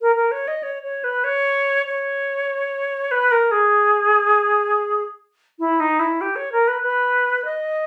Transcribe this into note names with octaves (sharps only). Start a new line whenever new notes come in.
A#4
A#4
C#5
D#5
C#5
C#5
B4
C#5
C#5
B4
A#4
G#4
E4
D#4
E4
G4
C#5
A#4
B4
B4
D#5